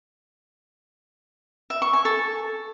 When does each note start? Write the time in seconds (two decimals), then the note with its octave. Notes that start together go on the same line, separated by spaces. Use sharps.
1.70 E5
1.82 C#6
1.93 G#5
2.05 A4